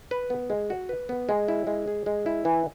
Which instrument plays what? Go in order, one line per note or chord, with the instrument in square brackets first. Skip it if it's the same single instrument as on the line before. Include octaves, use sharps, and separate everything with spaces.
[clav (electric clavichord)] B4
B3
G#3
F#4
B4
B3
G#3
E4
G#3
G#4
G#3
E4
E3